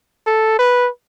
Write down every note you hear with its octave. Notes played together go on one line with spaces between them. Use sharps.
A4
B4